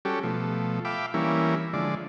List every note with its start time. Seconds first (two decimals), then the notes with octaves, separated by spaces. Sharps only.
0.05 G3 C#4 F#4 G4 A4
0.23 B2 F3 A3
0.85 E5 F5 G5 B5 D6
1.14 E3 G3 A#3 C#4 E4
1.73 D3 F3 G#3 D5